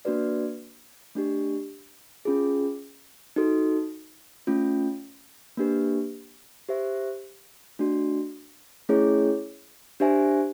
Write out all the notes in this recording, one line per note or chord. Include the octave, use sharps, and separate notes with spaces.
A#3 D4 F#4 B4 D5
A3 D4 G4
C#4 F4 G#4
D#4 F#4 A4
A3 C#4 F4
A#3 D4 G4 B4
G4 C5 E5
A3 D4 F#4
A3 C#4 E4 G#4 C#5
D4 G4 C5 E5 G#5